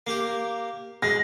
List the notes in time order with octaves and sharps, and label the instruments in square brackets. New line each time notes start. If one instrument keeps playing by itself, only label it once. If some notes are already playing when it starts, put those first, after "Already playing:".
[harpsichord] A#3 G4
[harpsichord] G#3 [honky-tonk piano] A#6